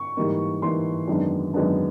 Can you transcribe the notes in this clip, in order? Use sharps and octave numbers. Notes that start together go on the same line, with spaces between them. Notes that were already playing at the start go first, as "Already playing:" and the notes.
Already playing: C#6
G#2 E3 G3 A#3 D#4
G#2 E3 G3 A#3 D#4 C6
F#2 D#3 G#3 B3 D4
F#2 D#3 G#3 B3 D4